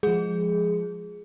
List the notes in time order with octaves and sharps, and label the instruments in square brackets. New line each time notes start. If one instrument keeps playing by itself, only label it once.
[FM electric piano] F3 G#3 [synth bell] G#4